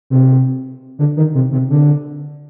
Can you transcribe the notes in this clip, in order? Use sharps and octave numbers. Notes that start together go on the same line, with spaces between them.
C3
D3
D#3
C3
C3
D3